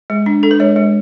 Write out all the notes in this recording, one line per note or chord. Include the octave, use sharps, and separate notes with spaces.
G#3
D4
D4 A4
B4
G#3 C#5
G#3